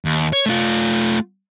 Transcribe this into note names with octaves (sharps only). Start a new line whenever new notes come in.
D#2
C#5
A3 F4